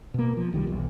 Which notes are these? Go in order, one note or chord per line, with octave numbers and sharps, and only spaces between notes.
B2 A#3
F3
C2 D#3 E3 G3
B1 E2